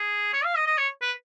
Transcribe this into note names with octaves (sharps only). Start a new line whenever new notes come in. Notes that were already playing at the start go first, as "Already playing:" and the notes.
Already playing: G#4
C#5
F5
D#5
D#5
C#5
B4